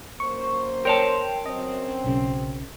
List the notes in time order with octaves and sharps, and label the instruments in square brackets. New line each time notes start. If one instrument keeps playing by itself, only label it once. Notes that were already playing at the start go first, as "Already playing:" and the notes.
[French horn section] F#2 A#3 C5 [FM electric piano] C#6
[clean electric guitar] A#4 C#5 A5 [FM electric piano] G5 C6
[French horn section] F#2 C4 [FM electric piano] D#5
[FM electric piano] B1 C#3